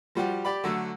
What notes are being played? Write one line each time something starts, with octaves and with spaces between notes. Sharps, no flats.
F3 G3 F#4 G4
G4 D5 B5
D3 F#3 A3